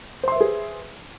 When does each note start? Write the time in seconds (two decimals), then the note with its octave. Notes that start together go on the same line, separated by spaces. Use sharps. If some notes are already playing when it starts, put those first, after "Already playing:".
0.23 C5
0.28 C6
0.32 E5
0.36 B4
0.41 G#4